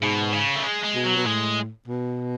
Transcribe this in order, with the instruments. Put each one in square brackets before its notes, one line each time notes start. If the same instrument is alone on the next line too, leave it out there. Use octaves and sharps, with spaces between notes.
[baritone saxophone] G#2 [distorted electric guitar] B2
[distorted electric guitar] C#3
A3
G#3
G#3
[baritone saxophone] B2
[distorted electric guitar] F#3
[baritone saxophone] B2
[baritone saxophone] A2 [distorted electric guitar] G#3
[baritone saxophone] B2